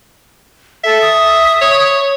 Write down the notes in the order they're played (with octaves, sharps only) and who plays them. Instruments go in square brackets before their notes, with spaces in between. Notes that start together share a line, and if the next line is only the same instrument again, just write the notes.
[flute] A4 [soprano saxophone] E5
[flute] D#6
[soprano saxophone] C#5